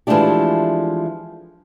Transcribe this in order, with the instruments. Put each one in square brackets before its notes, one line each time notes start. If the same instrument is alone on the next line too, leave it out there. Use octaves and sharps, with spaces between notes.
[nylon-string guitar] E3 F3 G#3 A3 D4 G4